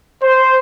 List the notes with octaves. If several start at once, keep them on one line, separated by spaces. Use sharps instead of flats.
C5